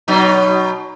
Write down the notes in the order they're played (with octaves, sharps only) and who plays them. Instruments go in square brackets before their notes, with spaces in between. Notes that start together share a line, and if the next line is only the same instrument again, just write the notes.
[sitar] B2 F#3 D#4